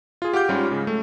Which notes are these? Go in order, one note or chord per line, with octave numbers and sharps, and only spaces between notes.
F4 G#4
G4 F5 F#5 D6 G6
G#2 G3 C#4 F4
C#3 G#3
A3